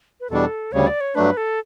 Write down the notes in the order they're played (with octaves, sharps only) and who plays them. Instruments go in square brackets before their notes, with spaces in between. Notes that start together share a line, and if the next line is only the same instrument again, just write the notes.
[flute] B4
[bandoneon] E2 B2 G3 D4 [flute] A4
[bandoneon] D2 C#3 G3 [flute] C#5
[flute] D5
C#5
[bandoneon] G2 F#3 A3 D4 [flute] B4
[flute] A4